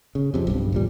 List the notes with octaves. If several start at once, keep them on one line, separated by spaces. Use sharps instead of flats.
C#3
F2 C3
B1 G2
E1 A#2 G3